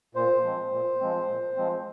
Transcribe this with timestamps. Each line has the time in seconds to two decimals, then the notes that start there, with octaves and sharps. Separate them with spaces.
0.15 A#2 C5
0.43 F3 G#3 C4
0.71 A#2
1.00 F3 G#3 C4
1.28 A#2
1.57 F3 G#3 C4